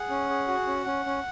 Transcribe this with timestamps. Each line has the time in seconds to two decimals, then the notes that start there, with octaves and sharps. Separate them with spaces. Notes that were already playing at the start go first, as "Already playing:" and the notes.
Already playing: G#4 F#5
0.10 C#4
0.30 G#4
0.48 F#4
0.67 C#4
0.86 C#4
1.05 C#4